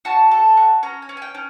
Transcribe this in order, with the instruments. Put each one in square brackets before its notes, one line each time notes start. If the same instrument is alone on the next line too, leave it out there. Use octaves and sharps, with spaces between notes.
[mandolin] F#4 A5
A4
F#4
C#4 A#5
G#5
C#4
G#5
G5
C#4